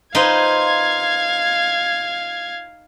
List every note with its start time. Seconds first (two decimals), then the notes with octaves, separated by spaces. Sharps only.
0.15 D#4 F4 B4 C5 F5 G#6